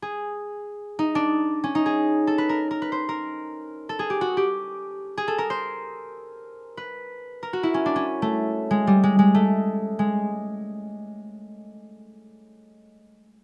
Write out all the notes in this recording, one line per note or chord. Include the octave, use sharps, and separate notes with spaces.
G#4
D#4
D4
C#4
D#4
G#4
A4
B4
A#4
A#4
B4
C5
A#4
A4
G#4
G4
F#4
G4
G#4
A4
A#4
C5
B4
A#4
F#4
E4
C#4
D4
C#4
A3
G#3
G3
G#3
G#3
A3
G#3